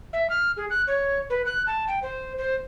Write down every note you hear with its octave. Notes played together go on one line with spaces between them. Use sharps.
E5
F6
G#4
F#6
C#5
B4
F#6
A5
G5
C5
C5